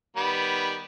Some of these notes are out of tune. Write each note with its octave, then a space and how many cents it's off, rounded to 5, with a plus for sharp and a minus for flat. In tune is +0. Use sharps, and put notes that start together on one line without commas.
D#3 -5 G3 +0 B3 +0